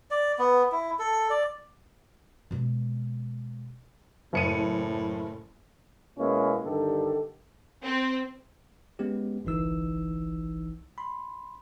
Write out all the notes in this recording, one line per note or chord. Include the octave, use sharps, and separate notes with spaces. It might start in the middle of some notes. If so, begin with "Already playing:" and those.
D5
B3
E4
A4
D5
B2 G#3
F#1 A2 C#7 D#7
B2 G#3 A#3 C#4 E4
G2 D3 D#3 G4 A4
C4
G#3 B3 C#4 G4
G1 C2 E3 D#4 E6
B5 C6